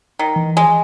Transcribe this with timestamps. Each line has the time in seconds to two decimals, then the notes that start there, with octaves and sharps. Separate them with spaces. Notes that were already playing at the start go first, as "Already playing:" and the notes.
0.19 D#3
0.36 E3
0.57 G#3